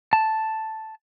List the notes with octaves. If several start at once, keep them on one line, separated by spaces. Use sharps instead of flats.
A5